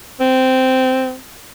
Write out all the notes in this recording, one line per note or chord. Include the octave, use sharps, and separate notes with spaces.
C4